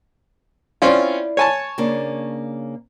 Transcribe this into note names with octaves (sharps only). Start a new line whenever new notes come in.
C4 C#4 E4 F4 D5
C#5 G#5 A5
C#3 A#3 D4